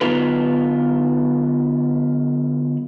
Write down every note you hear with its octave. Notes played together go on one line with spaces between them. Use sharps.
D3 F#3 B3 D#4 F4 B4